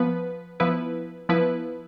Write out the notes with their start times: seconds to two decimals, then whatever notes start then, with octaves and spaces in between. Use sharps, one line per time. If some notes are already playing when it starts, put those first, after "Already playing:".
Already playing: F3 B3 B4
0.60 F3 B3 E4 B4
1.29 F3 B3 E4 B4